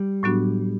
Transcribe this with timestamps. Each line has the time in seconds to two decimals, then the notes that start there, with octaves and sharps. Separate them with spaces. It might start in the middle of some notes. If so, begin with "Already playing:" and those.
Already playing: G3
0.23 A2 F#3 B3 D4 F#4